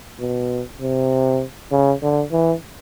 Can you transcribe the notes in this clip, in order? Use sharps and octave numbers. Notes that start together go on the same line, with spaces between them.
B2
C3
C#3
D3
E3